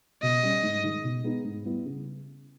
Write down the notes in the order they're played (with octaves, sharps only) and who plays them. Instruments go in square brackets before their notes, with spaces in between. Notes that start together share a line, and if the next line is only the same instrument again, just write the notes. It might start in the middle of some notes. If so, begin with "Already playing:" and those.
[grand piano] B2 [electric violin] D#5
[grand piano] G3 C#4
G#2
D#3 G#3
B2
G#3 B3 D#4
G#2
G3 B3 E4
C#3